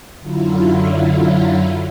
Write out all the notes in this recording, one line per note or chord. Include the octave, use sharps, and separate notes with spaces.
F#2 D3 F#3 E4 F4